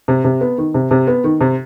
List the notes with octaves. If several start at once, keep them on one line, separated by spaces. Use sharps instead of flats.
C3
C3
B3
D#3
C3
C3
B3
D#3
C3